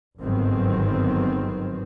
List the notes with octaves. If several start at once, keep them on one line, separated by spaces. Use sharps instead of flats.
G1 G#2 D#3 F#3 B3 C4